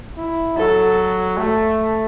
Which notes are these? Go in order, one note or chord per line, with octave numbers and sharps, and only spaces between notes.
E4
F#3 A4
A3